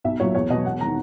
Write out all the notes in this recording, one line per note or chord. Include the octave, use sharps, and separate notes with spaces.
B1 E5
A#2 F#3 C#5
E2 C#5
B2 F#3 D#5
E1 F#5
D#3 A#5